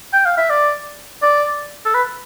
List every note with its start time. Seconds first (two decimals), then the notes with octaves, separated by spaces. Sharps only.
0.13 G5
0.26 F5
0.38 E5
0.50 D5
1.23 D5
1.85 A4
1.95 B4